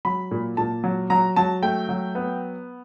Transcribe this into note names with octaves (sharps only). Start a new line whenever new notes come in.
F#3 B5
A#2
A#2 A5
F#3
F#3 A#5
F#3 A5
A3 G5
F#3
B3